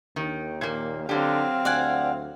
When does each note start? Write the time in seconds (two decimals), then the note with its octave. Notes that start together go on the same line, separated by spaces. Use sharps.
0.16 D#2 D#3
0.61 A#2 A#3
1.09 D3 F#3 C4 G4 F5
1.65 D2 D5 F#5 G#5